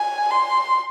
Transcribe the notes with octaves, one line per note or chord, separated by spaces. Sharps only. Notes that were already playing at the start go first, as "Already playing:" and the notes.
Already playing: G#5
C6